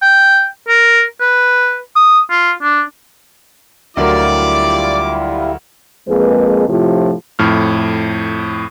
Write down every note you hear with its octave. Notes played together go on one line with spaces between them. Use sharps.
G5
A#4
B4
D#6
F4
D4
D2 F#3 G3 E4 F4 A#4 D5 D6
F2 G#3 A#3 G#4 B4
A2 C3 F3
F2 A2 F6